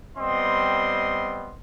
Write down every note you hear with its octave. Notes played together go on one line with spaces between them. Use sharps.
G3 B3 C4 D#5 C6